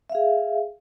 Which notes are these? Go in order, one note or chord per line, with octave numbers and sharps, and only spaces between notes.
G#4 E5 F5